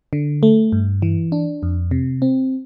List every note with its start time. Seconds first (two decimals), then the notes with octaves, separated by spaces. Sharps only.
0.13 D3
0.43 A3
0.72 G2
1.02 E3
1.32 D4
1.63 F2
1.91 C3
2.22 C4